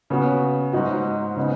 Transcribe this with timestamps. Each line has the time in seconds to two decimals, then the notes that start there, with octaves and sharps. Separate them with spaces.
0.10 C#3 B3 F#4
0.73 G#2 F#3 D#4 F#4
1.37 C#3 B3 D#4